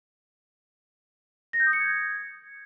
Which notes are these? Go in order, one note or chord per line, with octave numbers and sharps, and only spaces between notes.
A#6
G6
D#6
C#7
G#6